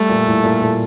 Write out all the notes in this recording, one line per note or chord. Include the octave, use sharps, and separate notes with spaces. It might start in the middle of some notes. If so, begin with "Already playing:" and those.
Already playing: G3 A3
A#2
A2
A#2
A#2